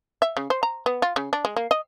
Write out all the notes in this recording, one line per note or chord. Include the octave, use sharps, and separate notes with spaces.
E5
C#3
C5
A#5
B3
F4
C#3
D4
G#3
A#3
D#5